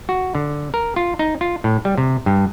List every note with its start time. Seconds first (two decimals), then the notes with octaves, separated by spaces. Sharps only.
0.09 F#4
0.35 D3
0.74 A#4
0.96 F4
1.19 D#4
1.41 F4
1.64 A2
1.85 G3
1.98 C3
2.26 G2